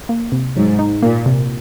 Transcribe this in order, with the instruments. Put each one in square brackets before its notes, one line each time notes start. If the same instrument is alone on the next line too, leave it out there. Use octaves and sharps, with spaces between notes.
[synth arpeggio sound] A#3
C3
[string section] G#2 [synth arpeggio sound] F#3
[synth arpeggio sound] D#4
[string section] A#2 [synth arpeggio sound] A#3
[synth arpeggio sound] C3